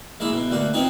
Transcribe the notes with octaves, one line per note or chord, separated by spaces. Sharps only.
G#3 A#3 E4
B2
D2 A#3 F#4
C4 D#4 F4 B4 C#5